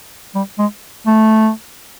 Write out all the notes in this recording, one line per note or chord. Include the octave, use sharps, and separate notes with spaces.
G3
G#3
A3